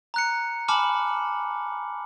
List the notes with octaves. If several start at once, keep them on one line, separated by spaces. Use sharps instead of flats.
A#5 F#6 C#7
G#5 A5 B5 D6 F6 F#7